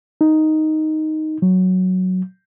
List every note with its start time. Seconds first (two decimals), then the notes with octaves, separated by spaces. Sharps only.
0.21 D#4
1.42 F#3